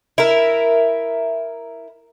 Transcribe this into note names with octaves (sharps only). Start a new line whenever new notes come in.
E4 A#4